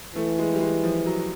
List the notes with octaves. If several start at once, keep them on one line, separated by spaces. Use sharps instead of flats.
E3 A3
G#3
G3
G#3
F3
F#3